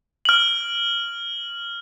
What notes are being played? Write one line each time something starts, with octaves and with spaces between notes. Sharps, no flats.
F6 F#7